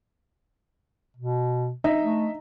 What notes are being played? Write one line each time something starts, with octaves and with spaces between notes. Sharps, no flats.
B2
D#4 D#5 E5
A3